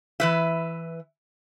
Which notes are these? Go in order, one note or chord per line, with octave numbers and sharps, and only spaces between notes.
E3 B4 E5